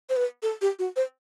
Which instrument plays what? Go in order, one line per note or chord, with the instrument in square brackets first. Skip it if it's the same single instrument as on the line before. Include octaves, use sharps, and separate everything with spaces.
[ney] C5
B4
A4
G4
F#4
C5